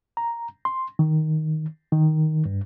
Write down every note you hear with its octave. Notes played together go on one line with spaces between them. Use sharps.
A#5
C6
D#3
D#3
G2